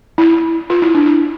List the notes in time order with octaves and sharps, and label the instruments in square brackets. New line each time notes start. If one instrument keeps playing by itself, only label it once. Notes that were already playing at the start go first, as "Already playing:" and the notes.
[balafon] E4
F4
E4
D4
E4